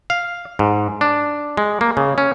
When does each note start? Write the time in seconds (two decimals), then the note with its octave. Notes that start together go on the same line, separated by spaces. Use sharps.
0.10 F5
0.59 G#2
1.01 D4
1.57 G#3
1.81 A#3
1.97 C#3
2.18 C#4